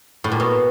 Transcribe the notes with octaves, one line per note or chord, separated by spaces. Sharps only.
A2
A#2
B2